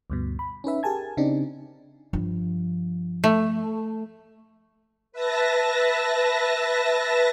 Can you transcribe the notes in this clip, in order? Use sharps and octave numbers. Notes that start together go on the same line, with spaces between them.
D2 G2 B2
B5
C#4 D#4 B4 E5
G4 G#4 A#4 G#5 A5 G#6
C#3 C4 D4 D#4 G4
G2 F3
A3
B4 E5 A5 A#6